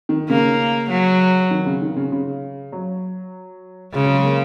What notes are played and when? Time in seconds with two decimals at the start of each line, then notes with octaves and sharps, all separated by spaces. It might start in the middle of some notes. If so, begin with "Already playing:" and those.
0.09 D#3
0.30 C#3 A#3
0.90 F#3
1.51 D#3
1.66 C#3
1.81 D#3
1.96 C#3
2.12 C#3
2.72 F#3
3.94 C#3 G#3
4.04 F#3
4.14 G#3
4.24 A#3